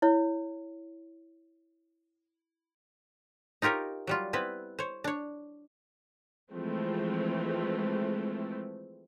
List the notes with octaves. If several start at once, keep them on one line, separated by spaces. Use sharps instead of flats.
E4 C#5
D#4 F4 G4 A#4 C#5
F#3 G3 F4
B3 C4 E4 B4
C5 C#5
D4 C#5
E3 F3 G#3 A3 C4